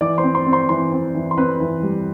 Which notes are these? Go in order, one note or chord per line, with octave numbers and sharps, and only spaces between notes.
E3 D5 D6
C5 C6
C4
C5 C6
C4
C5 C6
E3 C5 C6
C4
E3
C6
C4 B4 B5
E3
G3